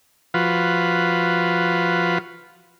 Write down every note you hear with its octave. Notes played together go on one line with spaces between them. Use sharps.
F3 F4 F#4 B4